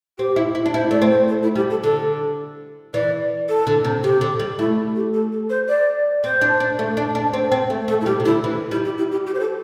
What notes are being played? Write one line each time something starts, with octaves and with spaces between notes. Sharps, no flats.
C4 G4
E4
E4
D4
E4 C5
A3 D5
C4
C5
A4
E4
G3 G4
A4
D3 A4
E3 D5
A4
D3
C3
C3 G4
D3
G3
A3 E4
G4
A4
A4
C5
D5
C4 C5
D4
D4
A3
D4
D4
C4
C4
A3
A3 A4
E4
G3 G4
C3
D3 E4
E3
G3 E4
G4
E4
G4
G4
C5
A4